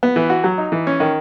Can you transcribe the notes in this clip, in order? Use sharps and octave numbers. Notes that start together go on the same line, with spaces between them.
B3
E3
F#4
F#3
D#4
E3
C#4
D#3